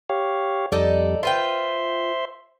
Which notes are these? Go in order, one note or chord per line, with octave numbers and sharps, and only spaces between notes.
G4 C#5 F5
F2 G3 D#4 A4 D5
F4 B4 C5 E5 G5 C6